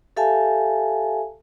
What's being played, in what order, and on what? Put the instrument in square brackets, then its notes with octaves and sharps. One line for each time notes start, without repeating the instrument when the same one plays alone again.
[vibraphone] G4 A4 E5 F5 G#5 A5